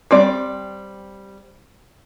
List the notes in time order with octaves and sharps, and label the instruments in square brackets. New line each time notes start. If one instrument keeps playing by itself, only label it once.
[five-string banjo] G3 C4 D5